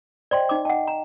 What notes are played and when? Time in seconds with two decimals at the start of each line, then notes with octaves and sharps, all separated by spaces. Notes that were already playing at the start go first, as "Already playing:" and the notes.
0.31 C5 D5 D#5 G5 C6
0.49 D#4 D6
0.65 D#5 F#5 G5 A5
0.87 A#5